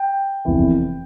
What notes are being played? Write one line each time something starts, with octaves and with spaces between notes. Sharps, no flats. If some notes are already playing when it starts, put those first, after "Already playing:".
Already playing: G5
F1 E2 C3 E3